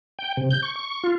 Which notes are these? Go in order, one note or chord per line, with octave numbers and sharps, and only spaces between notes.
G5
C3
G6
C#6
C#6
F4